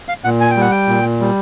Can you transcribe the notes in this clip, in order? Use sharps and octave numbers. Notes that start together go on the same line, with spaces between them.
F5
A#2 F#5
G#5
G5
G3 F#5
G5
A#2
G3